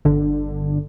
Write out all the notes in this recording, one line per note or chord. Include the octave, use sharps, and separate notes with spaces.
G1 D3